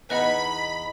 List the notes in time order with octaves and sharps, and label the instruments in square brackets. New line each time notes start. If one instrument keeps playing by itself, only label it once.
[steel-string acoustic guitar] E2 D#4 [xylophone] B4 D#5 F#5 [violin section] B5